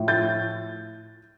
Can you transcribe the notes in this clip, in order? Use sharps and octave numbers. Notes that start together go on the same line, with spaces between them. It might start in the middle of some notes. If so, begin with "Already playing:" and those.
Already playing: A2 F3
G6 A6